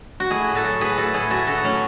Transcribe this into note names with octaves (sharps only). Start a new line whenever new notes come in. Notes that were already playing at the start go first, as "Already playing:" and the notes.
F#4
A3 E4 G#4
A2
F#4 A4
F#3
A2 G#4 B4
A3 F#4 A4
A2 E4 G#4
A3 F#4 A4
C#3 F#4 A4
F#3 A3 C#4